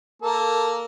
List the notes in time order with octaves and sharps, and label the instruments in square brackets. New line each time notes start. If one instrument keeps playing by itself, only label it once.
[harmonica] A#3 A4 [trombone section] A#4